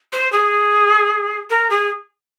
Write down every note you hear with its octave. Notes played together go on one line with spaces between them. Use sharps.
C5
G#4
A#4
G#4